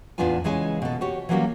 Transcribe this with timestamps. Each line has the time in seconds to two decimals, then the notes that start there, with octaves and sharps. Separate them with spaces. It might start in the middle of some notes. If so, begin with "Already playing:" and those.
0.18 E2 A2 B3 D4 F4 G#5
0.44 C#3 E3 G#3 C#4 G#5
0.82 B2 A4
1.01 F#4 G4 C#5
1.29 E3 F#3 G3 A#3 C#4 F#4